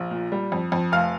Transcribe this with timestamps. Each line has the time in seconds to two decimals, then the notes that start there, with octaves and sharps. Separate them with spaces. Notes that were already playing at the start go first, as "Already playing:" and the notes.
Already playing: A#1
0.11 A#2
0.32 G3
0.52 F2
0.72 F2
0.92 F1 F5 F6